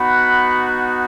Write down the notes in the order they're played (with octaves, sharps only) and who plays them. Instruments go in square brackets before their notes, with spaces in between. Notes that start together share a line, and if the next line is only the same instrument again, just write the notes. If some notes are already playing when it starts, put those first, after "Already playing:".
Already playing: [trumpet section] B3 D#4 F#4 F#5 B5